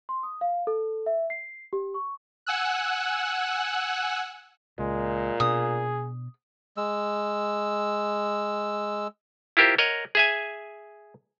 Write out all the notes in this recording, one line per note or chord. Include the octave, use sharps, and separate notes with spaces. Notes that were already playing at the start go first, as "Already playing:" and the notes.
C6
D#6
F5
A4
E5
C7
G4
C#6
F#5 G#5 E6 F#6
C#2 A#2 G#3
B2 D4 G#4 D#6
G#3 E6
E4 F4 G4 A#4 C5
A#4 C#5 D#5 F#5
G#4 E5 G#5